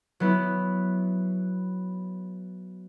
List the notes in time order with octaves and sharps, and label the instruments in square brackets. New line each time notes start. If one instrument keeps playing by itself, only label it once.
[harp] F#3 B3 E4